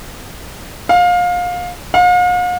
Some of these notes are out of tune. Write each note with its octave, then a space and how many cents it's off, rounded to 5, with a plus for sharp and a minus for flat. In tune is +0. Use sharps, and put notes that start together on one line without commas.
F5 +25
F5 +45